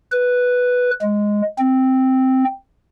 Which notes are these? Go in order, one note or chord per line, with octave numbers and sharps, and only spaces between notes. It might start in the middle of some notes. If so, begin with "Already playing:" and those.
B4
G#3
C4